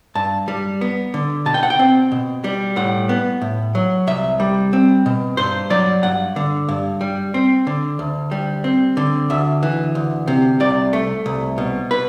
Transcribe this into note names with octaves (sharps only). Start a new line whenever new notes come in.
G2 A5
G3
B3
D3
B2 A5
G5
F#5
G5
C4
B2
G3
A2 F#5
B3
A2
F#3
C2 E5
G3
C4
B2
G2 C5
F#3 D5
G2 F#5
D3
G2
G3
C4
D3
D2
G3
C4
D3
D2 E5
E3
D2
C3
C2 D5
A3
C2
B2
B4